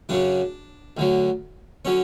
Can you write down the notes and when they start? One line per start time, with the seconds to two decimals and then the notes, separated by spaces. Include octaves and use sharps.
0.09 F#2 C#3 F#3 D4
0.97 D2 D3 F#3
1.85 D3 F#3 C#4